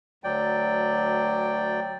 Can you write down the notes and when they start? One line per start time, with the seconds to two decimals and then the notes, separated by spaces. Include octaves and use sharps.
0.24 D2 F#3 D5 G5